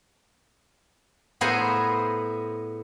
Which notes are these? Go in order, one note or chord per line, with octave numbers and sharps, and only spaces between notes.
A2 B3 G#4 C5 G#5 A#5